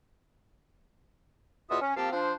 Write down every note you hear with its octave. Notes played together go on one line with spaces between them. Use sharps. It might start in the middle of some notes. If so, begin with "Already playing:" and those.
E2 B2 F4 F#4 E5 D#6
C#4
F3 A#3 C4 G4 F5 A5
F3 D4 C5